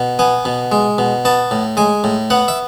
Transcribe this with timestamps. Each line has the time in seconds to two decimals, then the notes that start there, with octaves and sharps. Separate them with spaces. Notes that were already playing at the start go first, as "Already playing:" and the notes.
Already playing: B2
0.19 B3 G#5
0.45 B2
0.72 G#3
0.98 B2
1.25 B3 A5
1.51 A2
1.77 G#3 G#5
2.04 A2
2.30 B3 F#5
2.48 E5